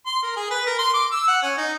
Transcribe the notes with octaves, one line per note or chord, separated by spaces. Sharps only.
C6
A#4
G#4
B4
A#4
C6
D6
E6
F#5
C#4
D#4